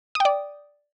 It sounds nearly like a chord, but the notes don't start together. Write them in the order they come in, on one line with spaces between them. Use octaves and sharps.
D#6 G5 D5